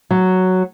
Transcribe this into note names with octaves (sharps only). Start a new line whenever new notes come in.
F#3